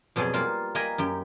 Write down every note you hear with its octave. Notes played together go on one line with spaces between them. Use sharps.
F2 B2 F#3 G#4 D5
G3 A#3 F4
A#3 D#5 G5 G#5 B5
F#2 G4 G5